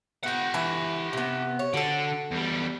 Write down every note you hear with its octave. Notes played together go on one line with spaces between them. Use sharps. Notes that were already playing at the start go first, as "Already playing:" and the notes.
B3 G4 F#5 G5
E3 G#5
C3 B3
C#5
D3 F#4 A4
E2 G3